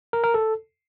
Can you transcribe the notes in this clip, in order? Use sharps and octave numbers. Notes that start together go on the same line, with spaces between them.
A#4
A#4
A4